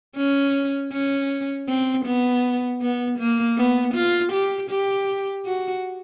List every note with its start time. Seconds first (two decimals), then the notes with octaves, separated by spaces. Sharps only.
0.17 C#4
0.93 C#4
1.68 C4
2.06 B3
2.81 B3
3.19 A#3
3.57 B3
3.95 F4
4.33 G4
4.70 G4
5.46 F#4